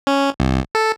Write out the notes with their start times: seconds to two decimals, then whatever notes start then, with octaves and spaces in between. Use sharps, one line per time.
0.07 C#4
0.40 C2
0.75 A4